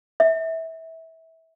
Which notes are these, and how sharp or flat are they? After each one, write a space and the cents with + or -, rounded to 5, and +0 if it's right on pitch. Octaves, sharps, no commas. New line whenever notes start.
E5 -20